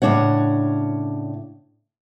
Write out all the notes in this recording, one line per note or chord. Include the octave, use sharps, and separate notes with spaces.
A2 C#3 G#3 D4 C#5 F#5